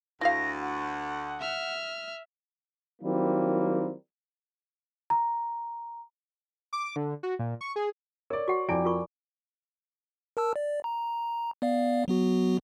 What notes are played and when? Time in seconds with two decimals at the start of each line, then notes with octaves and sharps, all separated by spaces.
0.21 D2 E4 F#4 F5 A#6
0.61 F#5
1.40 E5 F6
3.02 D#3 F#3 G3 A#3 C4 E4
5.10 A#5
6.73 D6
6.96 D3
7.23 F#4
7.39 A#2
7.61 C#6
7.76 G#4
8.30 A#4 C#5 D5
8.48 F#4 F#5 C#6
8.69 F2 E4 D5 G5 G#5 D6 D7
8.85 F4 A#4 C#6
10.37 A#4 A5 E6
10.56 D5
10.84 A#5
11.62 B3 D5 F5
12.08 F#3 B3 F#4